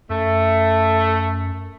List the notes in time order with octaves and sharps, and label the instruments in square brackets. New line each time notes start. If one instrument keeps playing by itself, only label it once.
[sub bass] F#2 [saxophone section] A3